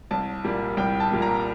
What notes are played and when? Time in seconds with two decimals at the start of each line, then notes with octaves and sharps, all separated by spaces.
0.11 C2 A5
0.44 A#2 G3 A#3
0.77 C2 G5
1.00 A5
1.11 A#2 G3 A#3
1.22 A#5